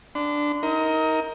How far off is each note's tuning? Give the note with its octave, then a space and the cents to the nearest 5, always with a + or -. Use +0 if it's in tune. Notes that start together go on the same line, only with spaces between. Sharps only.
D4 +0 C6 -40
D#4 +30 A#4 +0 D#6 +35